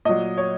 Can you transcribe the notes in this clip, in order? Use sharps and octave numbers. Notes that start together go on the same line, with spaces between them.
A#2 F#3 D#5
C#5